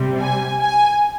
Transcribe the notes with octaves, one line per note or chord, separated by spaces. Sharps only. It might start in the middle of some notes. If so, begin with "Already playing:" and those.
Already playing: C3 G3
G#5
G#5